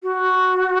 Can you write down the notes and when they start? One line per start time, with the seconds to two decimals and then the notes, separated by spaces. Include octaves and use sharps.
0.03 F#4